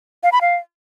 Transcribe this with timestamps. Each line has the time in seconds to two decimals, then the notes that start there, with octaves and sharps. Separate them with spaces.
0.23 F5
0.32 B5
0.41 F5